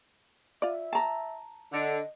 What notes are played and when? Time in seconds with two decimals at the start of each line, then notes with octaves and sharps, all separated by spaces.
0.62 F4 D5 E5
0.93 A5 A#5
1.72 D3 D#5